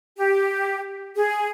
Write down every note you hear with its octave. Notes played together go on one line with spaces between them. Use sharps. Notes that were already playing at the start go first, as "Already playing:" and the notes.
G4
G#4